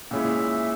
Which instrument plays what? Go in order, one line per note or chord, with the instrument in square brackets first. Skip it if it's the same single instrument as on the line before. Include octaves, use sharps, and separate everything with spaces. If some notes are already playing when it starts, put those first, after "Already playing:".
[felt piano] A#2 G#3 C#4 E4 [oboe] E5